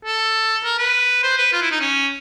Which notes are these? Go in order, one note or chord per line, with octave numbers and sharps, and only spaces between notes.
A4
A#4
B4
C5
B4
F4
E4
D#4
C#4